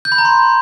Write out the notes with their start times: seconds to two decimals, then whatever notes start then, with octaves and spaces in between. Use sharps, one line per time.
0.05 G6
0.12 B5
0.18 A#5
0.25 C6